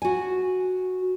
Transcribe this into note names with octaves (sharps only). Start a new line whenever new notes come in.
F#4 G#5